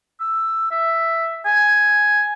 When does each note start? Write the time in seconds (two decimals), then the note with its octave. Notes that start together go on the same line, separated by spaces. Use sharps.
0.20 E6
0.71 E5
1.45 G#5